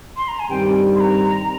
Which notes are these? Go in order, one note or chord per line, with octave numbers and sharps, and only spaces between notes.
C6
A#5
G#5
G2 D#3 G3 C4 G4 G5
C6
A#5